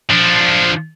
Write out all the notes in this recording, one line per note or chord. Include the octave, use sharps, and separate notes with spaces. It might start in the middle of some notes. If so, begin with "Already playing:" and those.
F3 D4